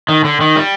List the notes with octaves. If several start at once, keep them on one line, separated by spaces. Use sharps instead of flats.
D#3
D3
D#3
G3